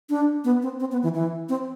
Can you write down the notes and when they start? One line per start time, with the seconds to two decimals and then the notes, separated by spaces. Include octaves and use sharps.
0.10 D4
0.44 B3
0.62 C4
0.80 C4
0.92 B3
1.03 E3
1.15 E3
1.49 C4